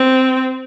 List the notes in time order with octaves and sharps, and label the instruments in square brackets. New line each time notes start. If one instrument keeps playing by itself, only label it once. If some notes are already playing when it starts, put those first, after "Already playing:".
Already playing: [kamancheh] C4